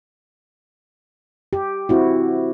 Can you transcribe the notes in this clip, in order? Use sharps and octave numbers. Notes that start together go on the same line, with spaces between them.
G4
C4 E4 F#4